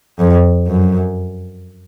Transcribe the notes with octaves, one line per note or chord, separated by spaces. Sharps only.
F2
F#2